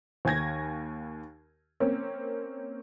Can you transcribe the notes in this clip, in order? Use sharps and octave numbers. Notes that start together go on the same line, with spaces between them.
D#2 G#5 G#6 A#6
A#3 C4 C#4